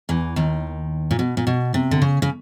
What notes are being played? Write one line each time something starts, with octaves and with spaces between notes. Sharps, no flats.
E2 E3
D#2 D#3
A#2
B2
A#2
B2
C3
D3
C#3
C#3